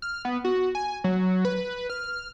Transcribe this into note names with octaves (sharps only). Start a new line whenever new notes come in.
F6
B3
F#4
G#5
F#3
B4
F6